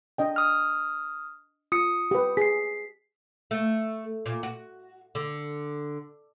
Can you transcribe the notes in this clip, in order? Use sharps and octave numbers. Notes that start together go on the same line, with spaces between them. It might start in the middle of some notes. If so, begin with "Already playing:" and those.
D4 D#5 G5
D#6 F6
F4 D#6 C#7
G4 B4
G#4 B6 C7
A3
A#2
F#4
D3